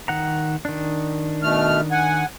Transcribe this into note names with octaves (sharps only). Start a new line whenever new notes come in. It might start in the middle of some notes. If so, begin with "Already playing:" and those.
D#3 F#5 A#5
D#3 D4
B2 A3 F6
F#5 G#5